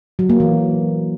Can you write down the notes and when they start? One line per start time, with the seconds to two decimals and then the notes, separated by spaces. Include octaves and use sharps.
0.19 F#3
0.29 A#3
0.40 E3